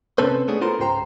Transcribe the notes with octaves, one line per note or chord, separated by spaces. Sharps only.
C3 C4 C#4 A4 B4 C5
A3 B3 C#4 D4 G#4
B3 F4 A4 A#4 C5 C6
C#2 G#2 G4 C5 G5 A#5